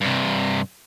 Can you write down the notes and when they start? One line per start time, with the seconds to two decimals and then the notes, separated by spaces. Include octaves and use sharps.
0.01 G2 C3